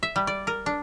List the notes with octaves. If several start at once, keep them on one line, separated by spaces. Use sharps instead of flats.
E5
G3
D5
A#4
D4